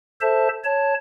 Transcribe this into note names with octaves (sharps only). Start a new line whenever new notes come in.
A4 C5 E5 A5
C#5 A5